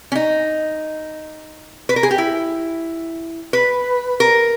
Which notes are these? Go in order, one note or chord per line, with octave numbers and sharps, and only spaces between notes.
C#4
D#4
B4
A#4
G#4
G4
E4
B4
A#4